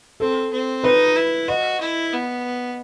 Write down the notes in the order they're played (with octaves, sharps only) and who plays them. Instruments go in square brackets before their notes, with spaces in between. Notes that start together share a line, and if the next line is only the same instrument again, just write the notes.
[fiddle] C4 [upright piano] A4
[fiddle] C4
[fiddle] D#4 [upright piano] B4
[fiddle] E4
[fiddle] F#4 [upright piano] D#5
[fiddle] E4
B3